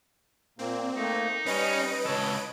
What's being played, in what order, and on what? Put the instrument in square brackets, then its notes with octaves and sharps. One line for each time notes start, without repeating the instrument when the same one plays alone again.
[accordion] A#2 A#3 [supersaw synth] C4
[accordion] A3 A#3 [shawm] D#4
[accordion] G3 [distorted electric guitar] C#4 [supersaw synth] B4 D#5 D7
[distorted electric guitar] C#2 A4 [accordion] C#5